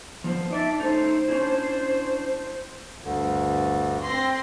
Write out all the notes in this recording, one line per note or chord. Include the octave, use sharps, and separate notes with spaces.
F3 B3 C5
D#4 D5 E5 A5
A3 C#4 D#4 C5
C#4 D4 E4
D2 G2 D3
C4 C6 A#6